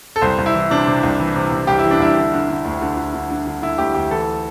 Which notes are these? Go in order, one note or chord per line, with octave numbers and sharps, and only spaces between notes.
A4
C2 C5
C2
E4
E3
C3 D4
C3
C2
E3
C3
C2
C2 G4
E4
E3
D4
C2 E4
D3
D3
D3
D2
D3
D3
D3
D3
D3
D3 E4
D2 G4
D2 G4
E3 A4